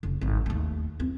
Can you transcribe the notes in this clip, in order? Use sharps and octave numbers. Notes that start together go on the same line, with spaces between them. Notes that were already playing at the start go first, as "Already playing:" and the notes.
F1 C#3
G#1 F3
D#2 A3
F#2 C4